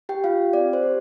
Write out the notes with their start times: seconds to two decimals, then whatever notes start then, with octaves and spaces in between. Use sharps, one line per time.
0.09 G4 G5
0.23 F4 G4 F5
0.53 C4 D5
0.73 C5
0.83 G4